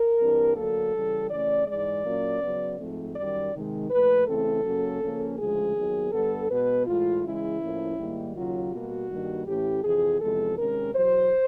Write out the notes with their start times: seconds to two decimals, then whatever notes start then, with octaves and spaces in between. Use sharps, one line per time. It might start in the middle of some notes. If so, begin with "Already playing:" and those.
Already playing: A#4
0.20 G2 E3 G3 C4
0.56 D2 D3 F#3 A#3 A4
0.94 C#3 E3 G3
1.31 C#3 E3 A3 C#4 D5
1.68 G#2 E3 G#3 D5
2.05 A#2 F#3 A#3 C#4
2.42 C#3 F#3 B3
2.79 G#2 F3 A3 C4
3.16 F#2 D#3 G3 D5
3.53 C3 D#3 G#3
3.90 A#2 F3 A3 B4
4.27 C#3 E3 A3 C4 A4
4.64 F#2 C#3 F#3 A#3 C#4
5.02 C#3 F3 A#3 C#4
5.38 D2 C#3 F3 G#3 G#4
5.76 D#2 D#3 F#3 B3
6.12 G2 D3 G3 B3 A4
6.50 B2 G#3 B3 B4
6.87 A2 E3 G#3 F4
7.24 C#3 E3 G#3 E4
7.61 A2 F3 A#3 C#4
7.98 G#2 D#3 G3 A#3
8.35 D#2 C#3 F#3 F4
8.72 B2 G3 A#3 F#4
9.09 G2 D#3 G3 A#3
9.47 A2 E3 A3 C#4 G4
9.84 F2 C3 E3 G#4
10.21 E2 C3 F3 G#3 A4
10.58 C3 D#3 G#3 C#4 A#4
10.95 E2 B2 F#3 C5